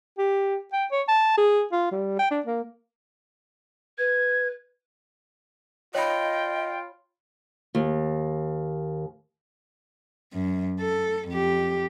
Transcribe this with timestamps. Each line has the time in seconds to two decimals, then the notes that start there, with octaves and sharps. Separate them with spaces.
0.18 G4
0.73 G5
0.92 C#5
1.08 A5
1.37 G#4
1.72 F4
1.92 G3
2.19 G5
2.30 D4
2.46 A#3
3.98 B4 G#6
5.95 F4 C#5 D#5 G5 B5
7.75 D#2
10.34 F#2
10.80 A4
11.29 F2 G4